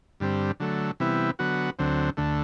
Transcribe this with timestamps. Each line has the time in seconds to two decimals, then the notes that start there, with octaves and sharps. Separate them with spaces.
0.20 G2 D3 G3 C4
0.60 D3 F#3 A3
1.00 C3 E3 G3 B3 E4
1.39 D3 F#3 B3 F#4
1.79 D2 D3 F#3 C4
2.17 D2 D3 A3